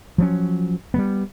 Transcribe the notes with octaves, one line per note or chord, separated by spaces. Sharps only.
F3 F#3 C#4
G3 G#3 B3